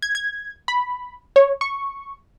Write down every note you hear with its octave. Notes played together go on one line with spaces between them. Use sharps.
G#6
G#6
B5
C#5
C#6